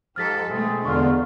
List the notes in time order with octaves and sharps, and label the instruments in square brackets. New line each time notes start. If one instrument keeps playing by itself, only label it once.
[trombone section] G#2 [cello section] F3 G4 A4 [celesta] F6 A6 B6
[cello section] B2 G#3 A3 [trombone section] C4 E4 G#4
[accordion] E2 D3 [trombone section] D#3 A3 F4 [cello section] D4 [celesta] C#6 F6